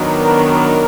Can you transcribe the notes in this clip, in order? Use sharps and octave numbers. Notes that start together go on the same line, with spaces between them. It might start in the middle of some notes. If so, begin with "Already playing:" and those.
Already playing: D#3 F#3 B3 D4
A#4
A#4